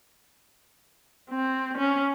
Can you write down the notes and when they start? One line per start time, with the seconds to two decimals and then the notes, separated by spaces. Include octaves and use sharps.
1.30 C4
1.77 C#4